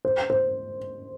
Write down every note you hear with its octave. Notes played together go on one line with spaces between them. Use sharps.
C5
C5